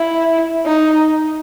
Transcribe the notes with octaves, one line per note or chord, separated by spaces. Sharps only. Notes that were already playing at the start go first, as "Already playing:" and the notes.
Already playing: E4
D#4